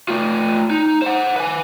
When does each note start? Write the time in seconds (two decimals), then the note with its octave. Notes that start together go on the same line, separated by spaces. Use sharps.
0.08 A3 F4
0.70 D#4
1.02 C5 F#5
1.36 B4 G#5